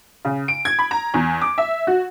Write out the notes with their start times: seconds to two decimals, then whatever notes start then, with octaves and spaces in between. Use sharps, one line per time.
0.25 C#3
0.48 D7
0.65 G#6
0.79 B5
0.91 A#5
1.14 E2
1.41 D6
1.58 E5
1.87 F#4